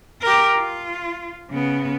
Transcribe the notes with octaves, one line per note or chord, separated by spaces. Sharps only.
G4 A#4
F4
C#3 B3